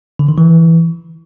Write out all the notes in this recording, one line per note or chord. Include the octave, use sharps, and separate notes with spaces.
D3
D#3
E3